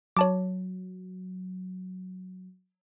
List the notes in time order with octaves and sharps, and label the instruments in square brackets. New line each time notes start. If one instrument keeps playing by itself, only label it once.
[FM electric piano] F#3 [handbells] C#5 A5 D6